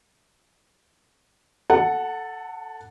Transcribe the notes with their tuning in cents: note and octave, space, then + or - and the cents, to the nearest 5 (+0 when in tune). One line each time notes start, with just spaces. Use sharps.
A4 +0 F#5 +0 A5 +45